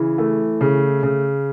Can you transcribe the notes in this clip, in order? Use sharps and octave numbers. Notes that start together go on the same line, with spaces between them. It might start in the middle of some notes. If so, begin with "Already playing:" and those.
Already playing: C#3 E3
A3
C#3
C#3